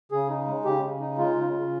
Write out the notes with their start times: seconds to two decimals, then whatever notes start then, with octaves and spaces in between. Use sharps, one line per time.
0.12 C#3 G#4
0.29 D#4
0.47 G#3
0.65 C#3 G4
0.83 C#3
1.01 D#4
1.18 G#3 F4
1.36 C#3
1.53 C#3